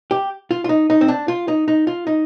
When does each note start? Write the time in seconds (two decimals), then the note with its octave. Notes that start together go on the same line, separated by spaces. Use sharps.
0.11 G4
0.51 F4
0.64 F4
0.69 D#4
0.90 D#4
1.01 C4
1.08 D4
1.28 F4
1.48 D#4
1.68 D#4
1.87 F4
2.07 D#4